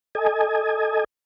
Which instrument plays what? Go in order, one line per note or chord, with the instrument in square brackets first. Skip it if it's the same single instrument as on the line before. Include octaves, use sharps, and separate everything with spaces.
[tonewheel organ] A4 D#5 G#5